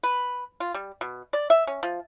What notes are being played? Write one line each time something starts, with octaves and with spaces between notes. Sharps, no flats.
B4
F4
G3
B2
D5
E5
C#4
F3